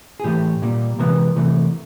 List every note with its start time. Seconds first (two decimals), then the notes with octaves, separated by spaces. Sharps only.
0.20 G#4
0.24 A2 E3 A3 G4
0.62 A#2 G3 A#3
0.99 C3 E3 G#3 B3 A#4
1.36 C3 E3 A3